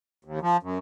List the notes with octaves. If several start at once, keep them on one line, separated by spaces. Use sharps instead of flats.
D#2
F3
F#2